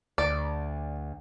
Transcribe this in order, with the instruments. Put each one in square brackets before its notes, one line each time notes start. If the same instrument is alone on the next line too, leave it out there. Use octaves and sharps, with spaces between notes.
[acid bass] D2 [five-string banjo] D5